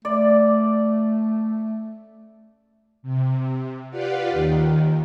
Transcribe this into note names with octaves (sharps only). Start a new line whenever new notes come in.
A3 D5
C3
F4 G4 B4 D5 F5 F#5
D#2 D#3